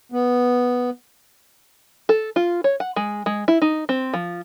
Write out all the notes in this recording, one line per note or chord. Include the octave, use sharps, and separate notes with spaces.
B3
A4
F4
C#5
F#5
G#3
G#3
E4
D#4
C4
F3